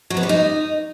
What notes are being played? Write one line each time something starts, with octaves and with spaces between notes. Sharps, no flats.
F#3
B3
G3
D#4